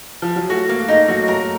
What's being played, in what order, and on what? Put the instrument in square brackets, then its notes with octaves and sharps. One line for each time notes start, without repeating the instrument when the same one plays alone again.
[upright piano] F3
F#3
[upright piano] A3 [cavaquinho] F#4
[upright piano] A#3 [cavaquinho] F5
[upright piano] A3 [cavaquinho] D#4
[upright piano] F#3 [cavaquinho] F#4
[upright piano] A3 [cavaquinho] A#4